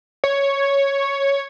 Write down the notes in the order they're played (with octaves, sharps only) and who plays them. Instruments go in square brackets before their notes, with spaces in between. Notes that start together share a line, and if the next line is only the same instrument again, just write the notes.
[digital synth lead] C#5